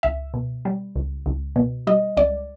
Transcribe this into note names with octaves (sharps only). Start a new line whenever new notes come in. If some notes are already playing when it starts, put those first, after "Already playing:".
C#2 E5
B2
G3
C#2
C#2
B2
G3 D#5
C#2 D5